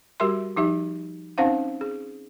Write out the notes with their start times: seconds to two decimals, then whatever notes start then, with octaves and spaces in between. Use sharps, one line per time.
0.20 G3 F#4 G4 A#4 E5 C6
0.57 F3 D#4 G4 E5
1.38 C4 C#4 D#4 C5 F5 F#5
1.81 G#4